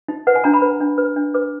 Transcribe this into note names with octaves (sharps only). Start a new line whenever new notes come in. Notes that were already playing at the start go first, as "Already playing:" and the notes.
D#4
B4 F#5
G#5
D4 A#5
B5
B4
D4
B4
D4
B4 D6